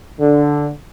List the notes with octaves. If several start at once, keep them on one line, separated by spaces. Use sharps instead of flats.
D3